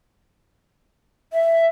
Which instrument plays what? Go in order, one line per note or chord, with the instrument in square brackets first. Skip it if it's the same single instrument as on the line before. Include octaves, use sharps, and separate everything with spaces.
[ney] E5